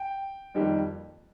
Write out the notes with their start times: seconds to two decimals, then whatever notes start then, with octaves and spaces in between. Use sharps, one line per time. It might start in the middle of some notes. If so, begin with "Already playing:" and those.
Already playing: G5
0.55 F2 D#3 G3 A#3